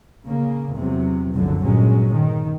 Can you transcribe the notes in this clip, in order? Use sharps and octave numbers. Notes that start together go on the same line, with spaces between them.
C#3 A#3
E2 C3 F#3
F1 C#2 F#2 D3 F#3
G1 A#2 F#3 G#3 C#4
D#3